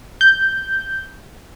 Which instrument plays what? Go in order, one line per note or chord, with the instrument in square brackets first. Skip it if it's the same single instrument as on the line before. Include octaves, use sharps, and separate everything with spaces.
[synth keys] G6